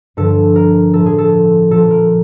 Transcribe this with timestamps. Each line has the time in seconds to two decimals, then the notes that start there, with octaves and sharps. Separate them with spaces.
0.17 G2 D3 F3 A4
0.56 A#4
0.94 A2 F3 A4
1.06 G#4
1.18 A4
1.71 A#2 F3 A4
1.91 A#4